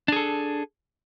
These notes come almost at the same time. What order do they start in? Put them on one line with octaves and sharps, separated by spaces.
D4 G#4 A4